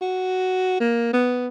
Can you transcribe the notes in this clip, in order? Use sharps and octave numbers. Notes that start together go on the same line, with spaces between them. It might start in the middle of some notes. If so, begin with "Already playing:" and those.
F#4
A#3
B3